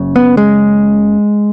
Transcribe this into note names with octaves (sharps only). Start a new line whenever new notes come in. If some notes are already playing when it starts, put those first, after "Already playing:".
Already playing: F#1 F#2 C#3
B3
G#3